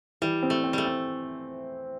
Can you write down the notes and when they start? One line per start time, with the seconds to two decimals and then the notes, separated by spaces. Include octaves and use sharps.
0.22 E3 G3
0.43 C4
0.50 A3
0.64 C4
0.73 G3 A3
0.85 C4